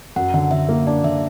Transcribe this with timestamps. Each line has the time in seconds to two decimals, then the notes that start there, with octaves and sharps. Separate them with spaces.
0.16 F#2 F#5
0.34 D3
0.51 D3 E5
0.69 A#3
0.87 D4 D5
1.04 D3 E5